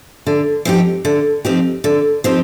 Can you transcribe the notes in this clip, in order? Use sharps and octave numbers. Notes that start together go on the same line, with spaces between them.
D3
F3 C4 D#4 G4
D3
F3 C4 D#4 G4
D3
F3 C4 D#4 G4